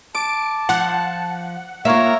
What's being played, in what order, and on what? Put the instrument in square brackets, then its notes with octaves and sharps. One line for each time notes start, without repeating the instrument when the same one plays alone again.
[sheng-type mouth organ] A5 [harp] D6 [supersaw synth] D7
[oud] F3 F4 [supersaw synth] F#5
[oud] A#3 F4 [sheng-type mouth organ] A#4 C#5 [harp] E5 F5 C#6